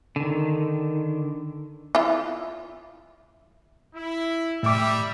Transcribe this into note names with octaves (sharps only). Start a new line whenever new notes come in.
D3 D#3
E4 F4
E4
A2 G3 E5 D6